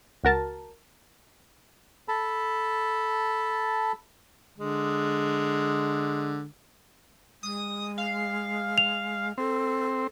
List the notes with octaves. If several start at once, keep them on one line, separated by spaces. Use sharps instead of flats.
C#2 F#4 A#4 A5
A4 A5 B5
D3 G#3
G#3 D#6
F5
F7
C4 A4